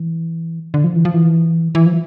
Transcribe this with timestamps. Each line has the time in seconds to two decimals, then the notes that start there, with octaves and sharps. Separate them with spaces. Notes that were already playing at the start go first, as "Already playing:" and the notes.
Already playing: E3
0.74 D3
0.84 F3
0.96 E3
1.05 F3
1.14 E3
1.75 E3
1.86 F3